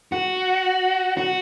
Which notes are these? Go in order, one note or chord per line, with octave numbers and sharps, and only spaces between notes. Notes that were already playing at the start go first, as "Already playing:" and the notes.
F#4
F#4